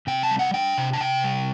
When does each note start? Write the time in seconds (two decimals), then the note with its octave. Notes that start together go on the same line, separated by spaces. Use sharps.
0.07 C3 G5
0.23 A5
0.31 G3
0.39 F#5
0.54 D4 G5
0.78 C3
0.93 A5
1.01 C3 G5
1.24 G3